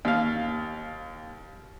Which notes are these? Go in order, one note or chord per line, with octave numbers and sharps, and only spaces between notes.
D#2 F5